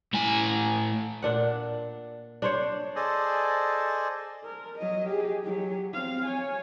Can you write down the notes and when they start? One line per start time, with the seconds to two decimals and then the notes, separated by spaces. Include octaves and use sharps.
0.13 A2 G#5
1.22 A#2 D4 F#5
2.42 D4 C5 C#5
2.96 G#4 A4 C5 D5 D#5
4.44 A#4
4.78 F#3 D#5
5.08 G4 G#4
5.44 F#3 G4
5.93 C4 F5
6.26 C#5 G#5